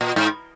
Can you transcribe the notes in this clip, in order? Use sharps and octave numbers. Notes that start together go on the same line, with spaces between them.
A#2
G#2